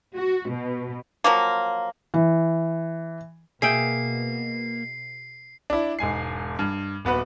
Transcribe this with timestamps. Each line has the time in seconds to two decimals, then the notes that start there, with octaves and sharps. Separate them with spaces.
0.16 F#4
0.48 B2
1.24 F3 F#3 A#3
2.14 E3
3.62 B2 A#3 G#4 E5 G5 C7
5.70 D4 E4
5.99 E1 G#2 G#5 C7
6.59 G2
7.05 D#1 B3 F#4 B4